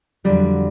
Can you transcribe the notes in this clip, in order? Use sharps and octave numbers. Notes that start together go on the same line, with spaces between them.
F2 D3 F#3 G3